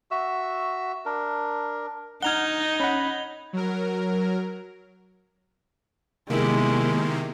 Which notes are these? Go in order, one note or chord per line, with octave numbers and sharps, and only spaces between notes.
F#4 E5 E6
D4 A#4
D#4 F#5 A#5 F6 G#6 F7 G7
C#4 F#5 B5
F#3 A#4
C3 D#3 G#3 A#3 B3 E4 G4